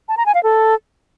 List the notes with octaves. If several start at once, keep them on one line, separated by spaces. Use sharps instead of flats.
A5
A#5
G#5
F5
A4